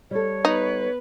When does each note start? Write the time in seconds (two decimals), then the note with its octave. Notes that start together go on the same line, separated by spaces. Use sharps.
0.11 G3 A4 C#5
0.45 B3 D#4 B4